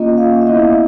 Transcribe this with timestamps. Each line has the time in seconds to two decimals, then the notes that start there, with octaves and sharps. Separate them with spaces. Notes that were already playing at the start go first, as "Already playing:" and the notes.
Already playing: A#3 C#4 F4 D#5
0.17 F5
0.41 E5
0.47 B3 E4 D#5